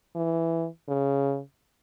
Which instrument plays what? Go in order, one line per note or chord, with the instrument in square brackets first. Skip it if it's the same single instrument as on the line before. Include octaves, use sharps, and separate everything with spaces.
[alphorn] E3
C#3